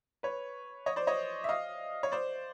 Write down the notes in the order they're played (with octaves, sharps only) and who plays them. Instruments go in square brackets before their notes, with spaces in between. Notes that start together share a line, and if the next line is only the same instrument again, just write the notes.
[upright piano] B4 C#5
C#5 D#5
C5 D5
C#5 D#5
E5
D#5 F5
C#5
C5 D5